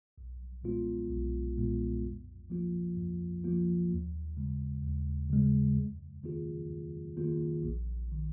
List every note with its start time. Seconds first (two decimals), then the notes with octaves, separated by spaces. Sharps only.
0.18 B1
0.64 A#2 G#3 B3 F4
1.11 B1
1.58 A#2 G#3 B3 F4
2.04 F2
2.50 F3 A#3 F4
2.97 F2
3.44 F3 A#3 F4
3.90 D#2
4.37 C#3 G#3
4.83 D#2
5.30 C#3 G#3
5.76 F2
6.23 D#3 A#3 F4 G#4
6.70 F2
7.16 D#3 A#3 F4 G#4
7.63 A#1
8.12 D#3